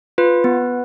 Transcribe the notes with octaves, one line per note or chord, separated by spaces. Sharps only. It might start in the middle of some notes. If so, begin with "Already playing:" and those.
F4 B4
B3